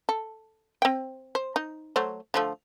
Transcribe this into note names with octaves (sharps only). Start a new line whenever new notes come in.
A4
C4 G5
C5
D#4
F#3 A3 C5
D3 F3 A3